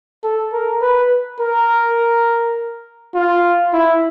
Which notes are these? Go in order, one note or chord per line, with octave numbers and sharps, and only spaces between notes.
A4
A#4
B4
A#4
F4
E4